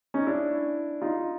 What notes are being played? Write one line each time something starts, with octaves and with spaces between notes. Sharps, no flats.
C#4 D#4
D4 E4
D#4 F4